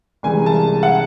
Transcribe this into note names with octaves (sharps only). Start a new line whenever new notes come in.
C2 C3 E3 G#3 G#5
A5
F#5